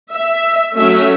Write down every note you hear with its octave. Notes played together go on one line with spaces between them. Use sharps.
E5
F#3 A3 C#4 E5